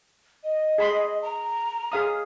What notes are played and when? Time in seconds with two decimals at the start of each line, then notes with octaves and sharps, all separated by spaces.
0.44 D#5
0.78 G#4 B5 C6
1.22 A#5
1.92 G#4 F5 D#6